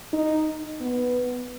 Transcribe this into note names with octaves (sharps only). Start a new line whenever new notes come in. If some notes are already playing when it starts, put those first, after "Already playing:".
D#4
B3